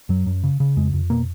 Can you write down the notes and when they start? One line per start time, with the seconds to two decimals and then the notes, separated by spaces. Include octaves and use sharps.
0.09 F#2 F#3
0.27 F#2
0.43 C#3
0.60 C#3
0.77 F2 G#3
0.93 F2
1.10 B2 A#3